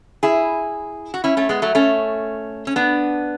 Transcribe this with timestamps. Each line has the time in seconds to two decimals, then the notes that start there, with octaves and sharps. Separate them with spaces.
0.23 E4 G#4
1.14 F#4
1.24 C#4 E4
1.37 A3 C#4
1.49 G#3 B3
1.62 F#3 A3
1.75 A3 C#4
2.67 C#4
2.76 B3 D4